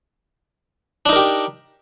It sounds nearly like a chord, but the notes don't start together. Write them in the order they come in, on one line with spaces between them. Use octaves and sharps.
D4 D#4 A#4 G4